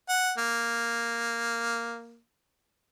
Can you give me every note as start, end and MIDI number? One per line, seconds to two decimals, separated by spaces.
0.09 0.33 78
0.38 2.18 58